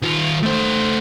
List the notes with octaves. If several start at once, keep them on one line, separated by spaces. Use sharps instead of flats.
D#3 F4
A3 C5